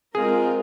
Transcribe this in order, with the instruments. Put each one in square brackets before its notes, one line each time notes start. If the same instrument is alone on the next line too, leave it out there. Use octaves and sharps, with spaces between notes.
[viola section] G#3 C4 F4 A#4 [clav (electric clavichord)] G#4